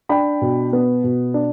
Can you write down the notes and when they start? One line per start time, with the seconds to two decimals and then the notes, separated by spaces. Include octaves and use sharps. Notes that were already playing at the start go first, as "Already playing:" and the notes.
0.09 D4 G5 B5
0.41 B2
0.73 B3
1.04 B2
1.34 D4